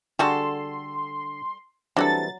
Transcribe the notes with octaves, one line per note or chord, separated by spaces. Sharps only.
D3 G3 F#4 G#4 A4 C6
E3 F#3 G3 C4 D4 F#4 A4 A6